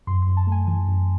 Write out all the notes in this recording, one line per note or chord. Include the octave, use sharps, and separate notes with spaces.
F#2 C6
F#2 C6
A5
A3 G#5
E3 G#5
F#2